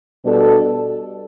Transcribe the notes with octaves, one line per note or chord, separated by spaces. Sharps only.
B2 G3 D4 A4